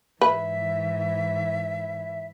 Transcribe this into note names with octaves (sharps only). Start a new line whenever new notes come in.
G#2 E3 B4 E5